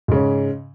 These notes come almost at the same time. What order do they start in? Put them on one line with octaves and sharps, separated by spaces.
G#2 C#3 C#4